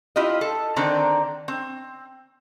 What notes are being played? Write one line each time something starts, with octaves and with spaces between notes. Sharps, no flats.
E4 F4 G4 D#5
A4
D3 D#3 C4 D4 D5 A#5
C4